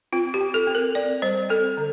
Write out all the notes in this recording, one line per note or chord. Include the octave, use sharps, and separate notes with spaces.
C4 F4
G4
C4
A4
C4
A#4
C4 D5
G3 C5
C4 A4
D3